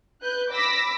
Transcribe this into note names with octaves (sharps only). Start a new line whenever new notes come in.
B4 F#6 G6
B5 D6 E6 A#6 B6